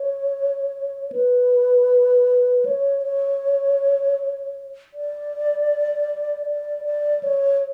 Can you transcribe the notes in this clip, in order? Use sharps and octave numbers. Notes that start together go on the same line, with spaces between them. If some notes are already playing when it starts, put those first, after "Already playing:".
Already playing: C#5
B4
C#5
C#5
D5
D5
D5
C#5